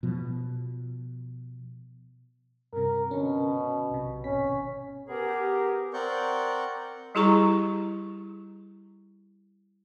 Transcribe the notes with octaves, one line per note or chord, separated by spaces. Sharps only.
B2 F3
G2 C3 A#4
B2 D3 C#4
B1 C3
G#1 B2 C#4 B6
B3 G4 G#4 A#4
C4 A#4 D5 F#5 C#6 G6
G3 E4 G4 G#4 A#5 C#6